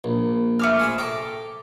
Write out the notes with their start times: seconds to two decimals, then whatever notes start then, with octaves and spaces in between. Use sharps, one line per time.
0.04 A#1
0.59 A3 D6 F6
0.79 G#4 C5 B5
0.98 A4 G5 A#5 D6